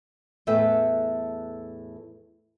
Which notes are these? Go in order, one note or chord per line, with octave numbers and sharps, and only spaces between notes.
E2 A2 A4 B4 E5 G5